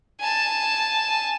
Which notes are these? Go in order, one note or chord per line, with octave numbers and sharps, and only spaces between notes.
G#5 A5